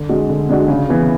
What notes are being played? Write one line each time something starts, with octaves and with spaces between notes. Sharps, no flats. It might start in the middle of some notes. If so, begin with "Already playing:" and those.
Already playing: D3
G#3 D4 F#4
D3
G#3 D4 F#4
C#3
E3 B3